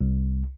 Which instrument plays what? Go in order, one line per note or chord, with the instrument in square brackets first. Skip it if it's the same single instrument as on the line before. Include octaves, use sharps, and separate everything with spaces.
[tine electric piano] C2